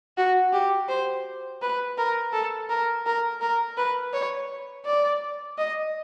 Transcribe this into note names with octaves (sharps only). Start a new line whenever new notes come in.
F#4
G4
C5
B4
A#4
A4
A#4
A#4
A#4
B4
C#5
D5
D#5